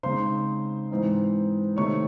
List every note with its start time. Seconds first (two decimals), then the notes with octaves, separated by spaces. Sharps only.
0.03 C#3 G#3 C4 D#4 C5 C6
0.91 G#2 E3 C4 D#4
1.77 C3 D#3 A3 C4 D#4 C#5 C#6